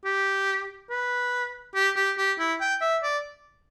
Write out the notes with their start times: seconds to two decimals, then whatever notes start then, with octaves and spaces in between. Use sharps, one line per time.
0.05 G4
0.90 B4
1.75 G4
1.96 G4
2.17 G4
2.39 E4
2.60 G5
2.81 E5
3.03 D5